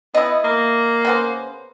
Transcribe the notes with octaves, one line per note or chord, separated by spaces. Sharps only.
B3 E4 D#5
A#3
C#3 B3 C5